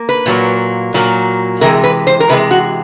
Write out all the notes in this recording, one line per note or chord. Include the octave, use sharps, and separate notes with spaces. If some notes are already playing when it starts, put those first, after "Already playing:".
Already playing: A#3
B4
A#2 F#3 A#3
A#2 F#3 A#3
C3 E3 G#3 A#4
B4
C5
A#4
C3 E3 G#3 B4
F#4